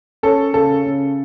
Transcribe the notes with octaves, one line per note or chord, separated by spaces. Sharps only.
C#4 A4
C#3 A4
C#3